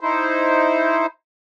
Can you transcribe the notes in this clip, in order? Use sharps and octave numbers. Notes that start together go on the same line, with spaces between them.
D#4 E4 C5